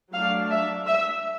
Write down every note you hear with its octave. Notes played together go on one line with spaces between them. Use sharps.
F#3 A3 D4 F5
E5
E5